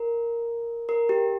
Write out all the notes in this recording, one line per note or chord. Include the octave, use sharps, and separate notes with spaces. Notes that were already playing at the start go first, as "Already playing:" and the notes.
Already playing: A#4
A#4
G4